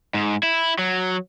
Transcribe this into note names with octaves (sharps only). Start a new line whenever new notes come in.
G#2
E4
F#3